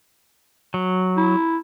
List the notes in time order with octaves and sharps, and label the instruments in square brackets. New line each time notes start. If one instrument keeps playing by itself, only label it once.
[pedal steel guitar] F#3
[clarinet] E4